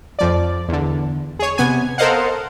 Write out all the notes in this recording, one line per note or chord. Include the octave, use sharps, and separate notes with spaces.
F2 F3 D5
E2 D3
G#4 C#5
C3 B3 G#5
A4 A#4 C5 D#5 F5 F#5